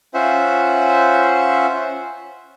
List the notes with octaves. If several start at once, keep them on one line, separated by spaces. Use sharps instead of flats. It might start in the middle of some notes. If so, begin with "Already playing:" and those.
C#4 F4 C5 E5 F#5